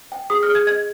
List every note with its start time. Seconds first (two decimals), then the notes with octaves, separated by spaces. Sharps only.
0.12 G5
0.30 G#4 D#6
0.43 F6
0.48 G#4
0.55 G#6
0.67 D#5 G#6